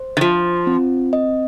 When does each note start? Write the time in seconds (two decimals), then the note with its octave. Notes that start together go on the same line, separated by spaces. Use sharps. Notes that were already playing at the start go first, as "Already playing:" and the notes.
Already playing: C5
0.17 D#3
0.21 F3 F4
0.67 C4
1.13 D#5